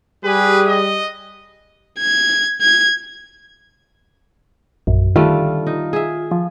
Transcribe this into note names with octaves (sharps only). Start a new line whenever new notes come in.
G3 G4 G#4 B4
D#5
G#6
G#6
A#1 F#2
D3 D#3 G3 A3 F4
D#4
G#4 E5
F3